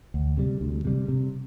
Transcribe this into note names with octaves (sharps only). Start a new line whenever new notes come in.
D2
C3 G3
D2
C3 G3
C3